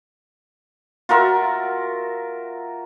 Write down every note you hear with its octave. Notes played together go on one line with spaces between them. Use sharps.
F4 F#4 A#4 E5